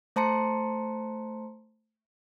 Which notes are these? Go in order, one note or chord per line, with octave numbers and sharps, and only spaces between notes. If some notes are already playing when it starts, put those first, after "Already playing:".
A3 C5 A5 A#5 C6 C#7